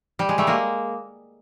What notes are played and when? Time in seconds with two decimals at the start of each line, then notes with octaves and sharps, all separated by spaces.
0.19 G3
0.29 G#3
0.38 G3 A3
0.47 G#3 A#3